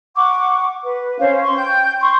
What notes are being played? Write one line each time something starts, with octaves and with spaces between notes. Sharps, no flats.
F#5 C#6 D6
B4
C#4 C5 F5
C6 C#6
G5 G6
C6 C#6